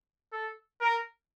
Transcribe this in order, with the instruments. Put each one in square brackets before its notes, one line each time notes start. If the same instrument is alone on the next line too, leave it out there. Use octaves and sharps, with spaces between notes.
[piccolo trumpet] A4
A#4